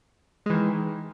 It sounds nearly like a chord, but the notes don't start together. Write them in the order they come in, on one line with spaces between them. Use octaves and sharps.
G#3 E3 D#3